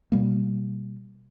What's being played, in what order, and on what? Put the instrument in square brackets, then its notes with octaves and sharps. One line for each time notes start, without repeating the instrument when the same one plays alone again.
[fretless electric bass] B2 G3 A#3